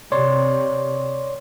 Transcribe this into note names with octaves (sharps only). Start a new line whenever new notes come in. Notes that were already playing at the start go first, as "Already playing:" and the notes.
C3 C#5 D5 C6